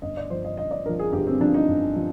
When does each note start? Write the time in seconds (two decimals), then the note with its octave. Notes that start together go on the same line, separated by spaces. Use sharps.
0.02 G1 D#5
0.17 D5
0.30 G2 F3 C5
0.45 D#5
0.57 G1 D#5
0.71 D5
0.85 G2 F3 A#4
0.99 G#4
1.12 G1 G4
1.27 C4
1.40 G2 F3 D4
1.54 D#4
1.68 G1
1.96 F3